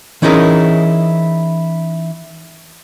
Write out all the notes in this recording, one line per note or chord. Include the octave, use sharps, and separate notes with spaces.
E3 C#4 D#4 E4 G#4 A#4